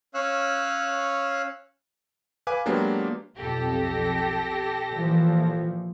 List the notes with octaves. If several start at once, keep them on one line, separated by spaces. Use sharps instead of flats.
C#4 C#5 F5 E6 F#6
B4 F5 G#5 D6
F#3 G#3 A#3 B3 D4 G4
B1 F2 G4 A4 A#6
A#2 E3 F3